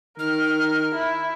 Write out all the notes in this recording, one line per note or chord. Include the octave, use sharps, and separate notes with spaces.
D#3 A#4 F6
E4